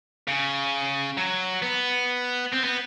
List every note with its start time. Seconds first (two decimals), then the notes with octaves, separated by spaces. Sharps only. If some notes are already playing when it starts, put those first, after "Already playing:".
0.28 C#3
1.17 F#3
1.62 B3
2.52 C4
2.64 B3